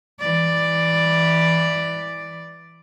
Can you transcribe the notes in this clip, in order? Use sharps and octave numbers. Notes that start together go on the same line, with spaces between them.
E3 D5